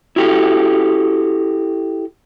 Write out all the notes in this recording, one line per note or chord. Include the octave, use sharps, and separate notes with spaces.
E4 F#4 G4 A4